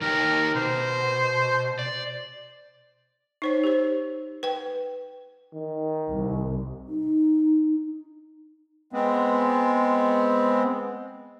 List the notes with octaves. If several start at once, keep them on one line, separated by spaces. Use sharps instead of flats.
D#3 D#4 G4 A#4
B2 C5
D5
D#4 C5 C#5
G4 C5
B4 G5
D#3
C2
D#4
G#3 B3 C4